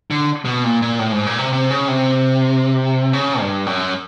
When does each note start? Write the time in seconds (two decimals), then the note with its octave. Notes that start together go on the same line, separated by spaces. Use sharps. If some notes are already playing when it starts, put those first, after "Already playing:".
0.11 D3
0.45 B2
0.64 A#2
0.82 A#2
0.99 A2
1.12 G#2
1.26 A#2
1.39 C3
1.53 C3
1.70 C#3
1.88 C3
3.13 C#3
3.40 G2
3.66 F#2